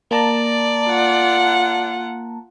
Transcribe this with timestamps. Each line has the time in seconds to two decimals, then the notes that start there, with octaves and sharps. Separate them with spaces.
0.11 A#3 D5 A5 A#5
0.87 F4 F#5